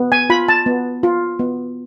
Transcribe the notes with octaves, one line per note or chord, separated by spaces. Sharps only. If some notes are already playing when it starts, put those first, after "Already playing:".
Already playing: B3
G#5
F4 B5
A5
B3
F4
B3